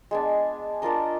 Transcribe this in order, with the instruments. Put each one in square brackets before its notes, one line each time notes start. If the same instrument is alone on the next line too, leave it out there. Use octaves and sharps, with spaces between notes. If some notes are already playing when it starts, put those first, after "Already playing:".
[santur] G#3 B3 D4
D4 F4 A#4 D#5